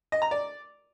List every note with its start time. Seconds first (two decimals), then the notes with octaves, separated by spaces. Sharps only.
0.12 D#5
0.22 A#5
0.31 D5